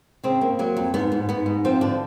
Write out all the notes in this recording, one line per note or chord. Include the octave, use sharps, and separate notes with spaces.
C#3 C4
A#3
F#3 A#3
F2
G#2 B3
G#2
G#2 B3
G#2
F3 C4
D3 D4